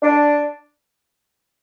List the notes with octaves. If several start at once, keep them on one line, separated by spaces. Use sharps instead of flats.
D4